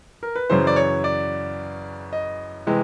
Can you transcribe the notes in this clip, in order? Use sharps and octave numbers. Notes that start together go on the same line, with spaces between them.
A#4
B4
F#2 C#3 E3 C5
D5
C#5
D5
D#5
C3 E3 G#3